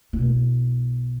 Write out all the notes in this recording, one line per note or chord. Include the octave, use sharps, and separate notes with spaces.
B1 E4